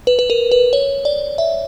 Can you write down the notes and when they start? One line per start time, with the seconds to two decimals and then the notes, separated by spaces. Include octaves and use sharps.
0.07 B4
0.19 B4
0.30 A#4
0.51 B4
0.73 C#5
1.05 D5
1.38 E5